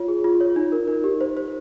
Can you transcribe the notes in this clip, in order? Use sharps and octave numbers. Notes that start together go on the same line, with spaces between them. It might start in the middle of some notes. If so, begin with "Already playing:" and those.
Already playing: F4 C#5
G#4
F4
C#5
D#4
A#4
D#4
G4
C5
C5